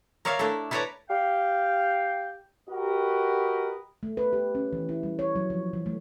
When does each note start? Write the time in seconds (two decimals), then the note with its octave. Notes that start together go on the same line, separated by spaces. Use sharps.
0.25 A#4 C#5 D5 E5 F5
0.39 A3 D4 E4 A4
0.71 E4 A4 B4 C#5 D5 A#5
1.09 G4 F5 G5
2.70 F#4 G4 A#4 B4 D#5
4.03 A3
4.17 B4
4.33 G4
4.55 C#4
4.73 E3
4.89 E4
5.03 G3
5.19 C#5
5.35 F#3
5.50 F3
5.73 E3
5.86 A3